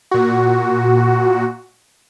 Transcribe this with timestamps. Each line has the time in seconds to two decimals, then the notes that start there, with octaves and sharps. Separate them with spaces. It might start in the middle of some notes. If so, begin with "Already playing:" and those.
0.11 A#2 F#4